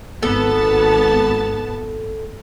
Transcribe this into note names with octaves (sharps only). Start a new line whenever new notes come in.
G#1 B3 A4 A5